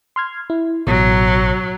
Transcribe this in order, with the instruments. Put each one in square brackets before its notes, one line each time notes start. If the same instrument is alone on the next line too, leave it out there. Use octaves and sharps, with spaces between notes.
[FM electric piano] C6 F6 G#6
E4
[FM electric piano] A1 B2 [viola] F#3